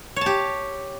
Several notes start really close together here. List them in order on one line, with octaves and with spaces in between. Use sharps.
C#5 A5 G4